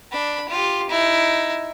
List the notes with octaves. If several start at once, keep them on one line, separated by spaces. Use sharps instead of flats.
D4 B5
F4 G4
D#4 E4